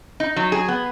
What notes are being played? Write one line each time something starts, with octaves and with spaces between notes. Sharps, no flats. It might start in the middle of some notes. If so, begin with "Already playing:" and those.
D#4
F#3
G#4
B3